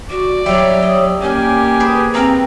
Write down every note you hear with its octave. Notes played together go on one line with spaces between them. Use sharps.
F#4 D5
F#3 G3 E5 G5
D#5
A#3 C#4 G4 G#5
G#4 B4 C5
C4 F5 G5 A#5